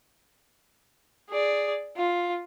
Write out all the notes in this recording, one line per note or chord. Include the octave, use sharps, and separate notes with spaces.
G#4 D5
F4